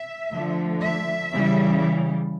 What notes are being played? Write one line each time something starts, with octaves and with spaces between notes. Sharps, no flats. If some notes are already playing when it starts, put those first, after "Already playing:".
Already playing: E5
D3 F3 A3
E5
C#3 E3 G3